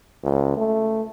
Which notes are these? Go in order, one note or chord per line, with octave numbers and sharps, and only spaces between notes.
C#2
A3